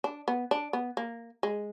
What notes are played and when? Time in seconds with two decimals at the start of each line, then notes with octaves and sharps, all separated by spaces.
0.04 D4
0.28 B3
0.51 D4
0.73 B3
0.97 A#3
1.43 G#3